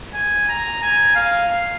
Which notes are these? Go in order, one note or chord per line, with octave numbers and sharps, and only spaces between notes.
G#5
A#5
G#5
F5